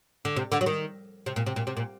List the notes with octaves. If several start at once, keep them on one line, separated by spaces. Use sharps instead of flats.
D3
C3
D3
F#3
D#3
C3
A#2
C3
A#2
C3
A#2